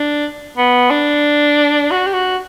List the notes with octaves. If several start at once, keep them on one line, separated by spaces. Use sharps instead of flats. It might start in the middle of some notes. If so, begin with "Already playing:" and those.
Already playing: D4
B3
D4
F#4
G4
F#4